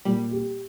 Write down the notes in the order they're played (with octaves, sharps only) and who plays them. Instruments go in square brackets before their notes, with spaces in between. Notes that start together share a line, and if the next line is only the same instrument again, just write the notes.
[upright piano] A#2 [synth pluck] G3
[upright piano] G4